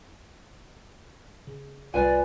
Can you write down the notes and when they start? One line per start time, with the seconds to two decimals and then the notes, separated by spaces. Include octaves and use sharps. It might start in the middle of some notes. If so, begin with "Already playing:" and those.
1.47 C#3
1.94 C2 F2 G3 F4 B4 D5 G#5